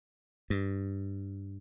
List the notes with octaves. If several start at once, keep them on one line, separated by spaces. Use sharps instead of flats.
G2